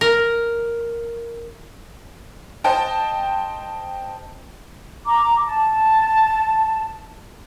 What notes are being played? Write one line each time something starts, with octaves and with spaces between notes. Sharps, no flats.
A#4
C5 D#5 G5 A5
A#5 D6
A5